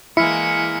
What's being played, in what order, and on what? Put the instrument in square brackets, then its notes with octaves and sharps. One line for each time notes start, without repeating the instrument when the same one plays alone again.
[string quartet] E3 G#3 A#3 [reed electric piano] E4 [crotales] F6 B6 C#7